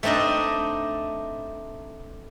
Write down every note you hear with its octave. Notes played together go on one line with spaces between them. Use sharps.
A3 C4 D4 D#4 D#5